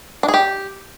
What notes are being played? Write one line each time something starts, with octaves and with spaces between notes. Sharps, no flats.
D4
G#4
G4